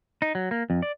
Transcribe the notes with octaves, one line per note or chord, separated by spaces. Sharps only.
D#4
F#3
A#3
F2
D5